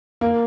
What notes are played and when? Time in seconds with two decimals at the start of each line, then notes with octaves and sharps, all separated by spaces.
0.21 A#3